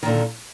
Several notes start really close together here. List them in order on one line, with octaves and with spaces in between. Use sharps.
D#3 A#2 D3